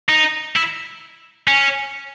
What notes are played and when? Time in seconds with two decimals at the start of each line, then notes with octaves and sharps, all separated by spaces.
0.09 D#4
0.56 E4
1.48 C#4